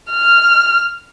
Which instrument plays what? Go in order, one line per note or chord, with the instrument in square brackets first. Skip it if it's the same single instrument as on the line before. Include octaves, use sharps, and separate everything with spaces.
[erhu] F6